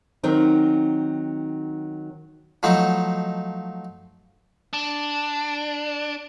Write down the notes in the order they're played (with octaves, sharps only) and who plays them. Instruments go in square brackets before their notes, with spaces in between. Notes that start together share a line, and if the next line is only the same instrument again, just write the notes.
[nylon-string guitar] D#3 F#3 C4 D#4
[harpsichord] F3 F#3 A3 D#4
[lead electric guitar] D4